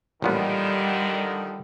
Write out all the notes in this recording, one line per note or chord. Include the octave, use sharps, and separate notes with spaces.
A1 A#2 D3 D#3 F3 G3 B3